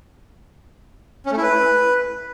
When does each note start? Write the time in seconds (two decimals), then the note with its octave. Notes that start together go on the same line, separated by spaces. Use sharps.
1.26 C#4
1.32 A3
1.37 E4
1.43 B4